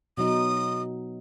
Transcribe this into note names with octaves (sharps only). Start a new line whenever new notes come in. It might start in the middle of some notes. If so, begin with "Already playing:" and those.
B2 F#3 D#4 D#6